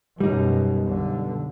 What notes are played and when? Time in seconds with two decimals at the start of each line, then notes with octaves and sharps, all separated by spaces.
0.20 F#2 B2 G3 D#4
0.84 B1 D3